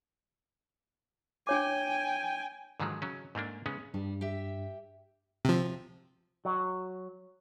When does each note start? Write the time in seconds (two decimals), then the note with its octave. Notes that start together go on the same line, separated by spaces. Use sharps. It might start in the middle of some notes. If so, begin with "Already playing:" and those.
1.47 D4 C#5 G5 G#5 D6
2.80 G#2 D3 D#3 F3 F#3 G#3
3.02 C#3 F#3 C#4
3.35 G#2 A3 A#3 D4
3.66 C#3 G#3 B3 C#4
3.94 G2 G3
4.21 G4 E5
5.45 C3 F3
6.45 F#3